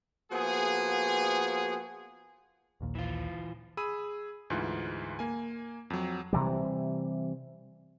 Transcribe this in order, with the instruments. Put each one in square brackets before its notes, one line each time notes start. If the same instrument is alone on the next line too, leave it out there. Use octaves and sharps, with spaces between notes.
[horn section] F3 A#3 B3 F#4 G#4
[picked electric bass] A#1 D#2 A#2
[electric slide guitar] E3 F4
[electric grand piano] G#4 B5 E6 D#7
D2 G#2 E3 F4
A#3 G#5
F2 F#3
[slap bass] C3 E3 G3